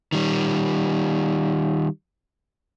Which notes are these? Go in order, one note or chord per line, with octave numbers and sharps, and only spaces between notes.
D#3 G3